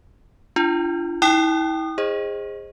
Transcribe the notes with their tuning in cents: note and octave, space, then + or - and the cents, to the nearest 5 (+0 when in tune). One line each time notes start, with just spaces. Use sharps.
D4 +0 F4 -35
E4 -35 G5 -5 D#6 -30
G#4 -20 C5 +20 D#5 +0